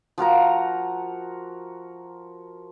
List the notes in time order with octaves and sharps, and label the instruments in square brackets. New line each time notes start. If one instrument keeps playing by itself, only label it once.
[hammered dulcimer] F3 F#4 A#4 A#5